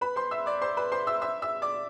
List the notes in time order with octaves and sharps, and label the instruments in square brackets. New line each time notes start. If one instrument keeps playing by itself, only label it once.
[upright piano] B4 B5
C5 C6
E5 E6
D5 D6
C5 C6
B4 B5
C5 C6
E5 E6
E5 E6
E5 E6
D5 D6